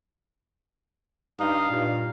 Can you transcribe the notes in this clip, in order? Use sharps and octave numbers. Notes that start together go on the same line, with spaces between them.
G2 D#4 F5
G2 A#2